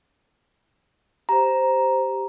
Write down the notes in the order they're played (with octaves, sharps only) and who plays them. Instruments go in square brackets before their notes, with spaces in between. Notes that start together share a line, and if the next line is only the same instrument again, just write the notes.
[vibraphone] G4 C5 [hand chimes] A#5